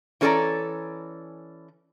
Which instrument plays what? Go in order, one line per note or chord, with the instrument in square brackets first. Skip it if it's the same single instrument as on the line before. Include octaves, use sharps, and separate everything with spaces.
[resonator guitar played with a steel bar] E3 C#4 A4 C#5 D5 A#5